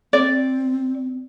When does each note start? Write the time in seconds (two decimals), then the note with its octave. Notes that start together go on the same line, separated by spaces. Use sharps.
0.13 C4 D5